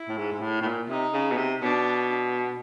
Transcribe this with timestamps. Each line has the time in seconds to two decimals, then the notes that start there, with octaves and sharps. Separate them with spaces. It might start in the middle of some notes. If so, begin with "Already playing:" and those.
Already playing: E4
0.08 A2
0.17 G#2
0.32 G#2
0.41 A2
0.62 A2
0.65 A#2
0.89 C3 D#4
1.13 C#3
1.32 B2
1.37 C3
1.61 B2 D4